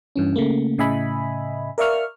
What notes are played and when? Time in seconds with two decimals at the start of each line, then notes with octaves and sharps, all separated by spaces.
0.16 G2 E3 C#4
0.36 C#3 A3 A#3
0.78 A2 C#3 D#5 E5 G#5 B5
1.78 A#4 D5 E5 F5 C#6 F6